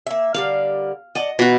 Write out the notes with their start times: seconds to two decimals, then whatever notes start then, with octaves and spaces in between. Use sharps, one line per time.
0.07 A#3 E5
0.34 D3 G3 A#4 F5
1.15 D5 D#5 F#5 A5
1.39 B2 E3 D#4 F#4